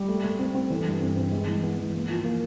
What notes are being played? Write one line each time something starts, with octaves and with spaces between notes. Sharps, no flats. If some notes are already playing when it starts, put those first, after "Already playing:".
Already playing: G3
A3
A3
C4
C4
E3
G2
C4
C4
G#3
E3
B3
E3
A#3
F3
A#3